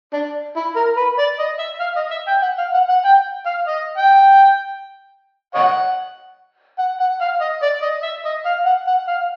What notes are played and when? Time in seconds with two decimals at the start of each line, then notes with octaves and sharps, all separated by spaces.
0.13 D4
0.56 E4
0.76 A#4
0.97 B4
1.18 D5
1.39 D#5
1.59 E5
1.80 F5
1.96 D#5
2.11 E5
2.27 G5
2.42 F#5
2.58 F5
2.74 F#5
2.89 F#5
3.05 G5
3.46 F5
3.68 D#5
3.98 G5
5.55 C#5 D#5 F#5
6.79 F#5
7.00 F#5
7.21 F5
7.41 D#5
7.62 D5
7.82 D#5
8.03 E5
8.25 D#5
8.46 F5
8.66 F#5
8.87 F#5
9.08 F5